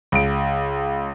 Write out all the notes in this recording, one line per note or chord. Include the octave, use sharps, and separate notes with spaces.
C#2 D7